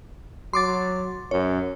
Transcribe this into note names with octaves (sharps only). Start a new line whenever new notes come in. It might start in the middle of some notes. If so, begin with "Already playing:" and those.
F#3 C6 D6 A6
F#2 C#5